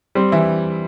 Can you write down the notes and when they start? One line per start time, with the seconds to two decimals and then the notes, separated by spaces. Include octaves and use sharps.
0.15 G3 C4
0.32 E3 E4